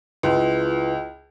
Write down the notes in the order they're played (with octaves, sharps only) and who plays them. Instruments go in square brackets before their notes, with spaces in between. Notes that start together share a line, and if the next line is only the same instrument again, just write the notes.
[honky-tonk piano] C#2 [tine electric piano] E4 F4 B4